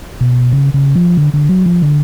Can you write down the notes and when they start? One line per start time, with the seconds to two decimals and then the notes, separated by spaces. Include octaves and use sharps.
0.21 B2
0.52 C#3
0.74 C#3
0.95 F3
1.17 D3
1.34 D3
1.49 F#3
1.66 F3
1.82 D3